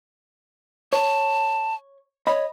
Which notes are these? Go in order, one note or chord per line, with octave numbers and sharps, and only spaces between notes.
C#5 A5
C#5 D#5 B5